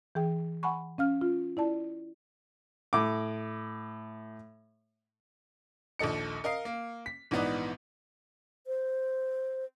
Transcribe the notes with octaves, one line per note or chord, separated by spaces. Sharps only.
E3 G#4 G5
F#5 G#5 B5 C#6
C#4 F5 F6
F4
E4 D5 A5
A2 D6
A#1 D#2 A4 D#5 C#7
A#4 D#5 F5 C7
A#3
B6
A#1 G#2 E3 B3 D#4 D5
C5